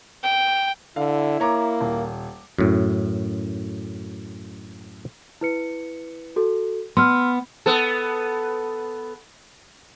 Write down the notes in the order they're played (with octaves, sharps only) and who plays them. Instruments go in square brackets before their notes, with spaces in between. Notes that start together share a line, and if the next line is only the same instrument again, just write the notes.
[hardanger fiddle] G5
[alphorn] D3 [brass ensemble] E4 [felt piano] F5
[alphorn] A#3 [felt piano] C#5 A#5 D6
[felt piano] D#1
[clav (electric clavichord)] F#2 A2
[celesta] E4 B4 C#7
F#4 A4
[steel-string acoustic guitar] B3 [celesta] C6 E6 F6
[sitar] B3 A4